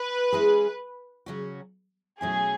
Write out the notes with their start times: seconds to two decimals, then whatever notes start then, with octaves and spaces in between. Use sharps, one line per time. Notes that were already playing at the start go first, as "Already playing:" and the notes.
Already playing: B4
0.32 G#3 C#4 E4 G#4
1.26 C#3 F#3 C#4 F#4
2.21 B2 F#3 A3 C#4 E4 G#4